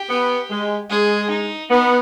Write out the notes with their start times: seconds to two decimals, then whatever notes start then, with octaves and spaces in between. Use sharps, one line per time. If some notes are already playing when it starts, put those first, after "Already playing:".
Already playing: G4
0.09 B3
0.49 G#3
0.90 G#3 G#4
1.30 D#4
1.70 B3 D#4